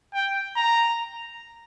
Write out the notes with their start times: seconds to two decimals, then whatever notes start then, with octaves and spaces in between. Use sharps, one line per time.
0.14 G5
0.56 A#5